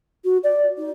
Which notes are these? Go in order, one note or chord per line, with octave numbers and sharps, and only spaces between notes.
F#4
D5
D#4